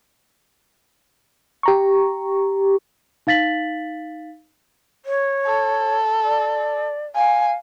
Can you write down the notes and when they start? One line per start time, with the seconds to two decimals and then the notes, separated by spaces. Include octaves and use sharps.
1.63 G4 A#5 C#6
3.27 D#4 F5 A6 B6 F#7
5.05 C#5
5.46 A4
6.24 D5
7.16 F5 G#5